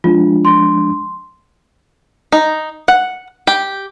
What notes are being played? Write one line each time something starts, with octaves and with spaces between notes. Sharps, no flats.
F3 G#3 D4 F4
C6
D#4
F#5
G4